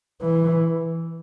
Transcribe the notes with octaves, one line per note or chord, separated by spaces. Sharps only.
E3